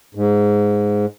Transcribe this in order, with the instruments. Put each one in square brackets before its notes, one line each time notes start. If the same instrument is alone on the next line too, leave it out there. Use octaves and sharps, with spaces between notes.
[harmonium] G#2